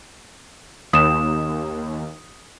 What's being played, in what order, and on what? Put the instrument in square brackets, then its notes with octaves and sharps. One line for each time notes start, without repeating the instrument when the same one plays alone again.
[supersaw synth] D#2 [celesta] D#6 E7